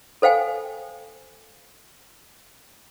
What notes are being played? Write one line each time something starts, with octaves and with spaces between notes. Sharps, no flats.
A4 C5 F5 G5 G#5